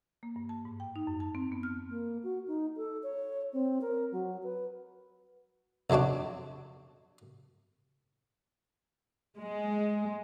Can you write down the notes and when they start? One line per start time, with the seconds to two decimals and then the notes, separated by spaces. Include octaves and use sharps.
0.23 A#3
0.36 G2
0.49 A5
0.65 G#2
0.80 G5
0.96 D#4
1.07 F#2
1.20 A5
1.35 C4
1.52 B3
1.63 F6
1.89 A#3
2.23 F#4
2.47 D#4
2.77 A4
3.03 C#5
3.53 C4
3.81 A#4
4.12 F#3
4.43 B4
5.90 B1 F2 G#3 D4 F#4
9.40 G#3